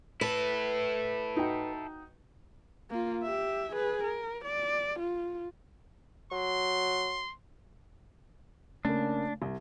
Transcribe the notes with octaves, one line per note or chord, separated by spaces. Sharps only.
E4 A4 B4
D#4 F#4 G5
A#3 F4
G4 E5
G#4 B4
A#4
D5
F4
F#3 C6
C#3 A3 A#3 D4
C2